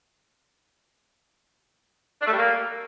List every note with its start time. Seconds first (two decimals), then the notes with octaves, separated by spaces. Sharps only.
2.21 D4
2.27 A3
2.32 G3
2.38 A#3